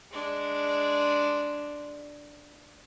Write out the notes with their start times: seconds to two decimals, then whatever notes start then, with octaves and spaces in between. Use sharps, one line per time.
0.11 G#3 D4